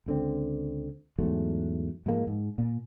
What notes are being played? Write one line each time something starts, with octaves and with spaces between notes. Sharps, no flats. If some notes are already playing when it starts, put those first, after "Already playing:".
C#2 D3 C4
E2 G#2 F#3 A3
G#2 F3 G#3 A#3
G#2
A#2